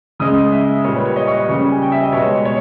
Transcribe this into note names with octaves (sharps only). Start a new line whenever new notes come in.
C#3 G#3 D#6
E5
A#2 G3 C#5
B4
C#5
D#5
C#6
D#5
C#3 G3
G#5
G5
E5
D#5
B2 G#3 C#5
C#5